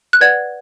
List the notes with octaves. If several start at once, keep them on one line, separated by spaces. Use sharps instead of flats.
F#6
B4 D5 F#5 G#6